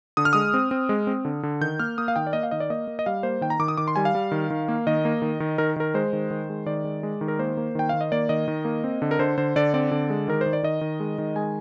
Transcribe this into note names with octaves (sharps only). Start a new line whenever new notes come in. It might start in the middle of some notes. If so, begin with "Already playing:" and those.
D3 D#6
F6
G#3 D#6
C4
C4
G#3
C4
D3
D3
D#3 G6
A#3 F6
A#3 D#6
F5
D#3 G5
D5
A#3 D#5
F5
D#3 D#5
D5
A#3 D#5
A#3
D#5
G3 F5
A#3 C5
D#3 G5
A#5
D#3 D6
D#6
D#3 D6
C6
G3 G#5
F5
G3
D#3
D#3
A#3
D#3 D#5
A#3
D#3
D#3
D#3 A#4
D#3 A#4
G#3 C5
D#3
D#3
G#3
D#3 D5
G#3
G#3
D#3
A#4
A#3 C5
A#3
D#3 G5
D#3 F5
D#5
A#3 D5
D#3 D#5
D#3
A#3
C4
D3
A#4
D3 C5
D3 C5
D3 D5
C4 D5
D3
G#3
D#3 A#4
D#3 C5
D5
D#3 D#5
D#3
G#3
D#3
G#3 G#5